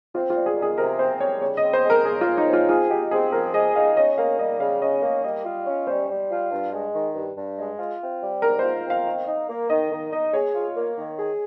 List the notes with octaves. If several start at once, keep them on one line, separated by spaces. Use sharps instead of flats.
C4 F4
F4
G3
G#4
D#3
G#4
C3 A#4
C4 C5
G3 C#5
C#3 C#5
D#5
C4
C5
G#3
A#4
C#3 G#4
F4
C#3
D#4
C4
F4
F4 G#4
D#4 G4
C4 G#4
F3 A#4
G#4 D#5
D#4 F5
C#4 D#5
A#3 F5
G3 D#5
C#3 F5
C#4 D#5
A#3 F5
G3 D#5
F4
C#4
G3 C5
G3
F4
G2
G#3
D#3
G2
G2
G#3
F4
C4
G3
G#2 A#4
C5
F4
C4
F5
D#3
D#4
A#3
D#3 D#5
D#3
D#4 D#5
G#4 C#5
F4
A#3
D#3
G#4